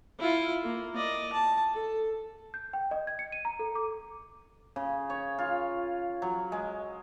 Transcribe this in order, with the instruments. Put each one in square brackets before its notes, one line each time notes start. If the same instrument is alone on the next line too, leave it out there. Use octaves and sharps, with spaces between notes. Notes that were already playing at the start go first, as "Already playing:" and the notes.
[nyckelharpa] E4 F4
A#3
D5 D#5
A5
A4
[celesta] G6
G5
D#5
G#6
C#7
D#7
A#5
A4
D6
[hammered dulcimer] C#3
C#5
F4
F#3
G#3